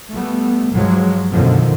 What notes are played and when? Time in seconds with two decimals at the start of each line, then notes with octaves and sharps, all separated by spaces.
0.11 G3 A3 B3
0.71 G2 F3 F#3 G#3
1.33 F#2 B2 D3 D#3 F3